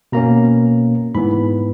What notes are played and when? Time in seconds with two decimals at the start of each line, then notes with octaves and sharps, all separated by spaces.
0.12 B2 A#3 C#4 A#5
1.15 G#2 E3 B3 B5